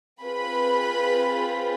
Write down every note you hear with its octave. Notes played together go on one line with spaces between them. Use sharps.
C4 F4 G#4 B4 B5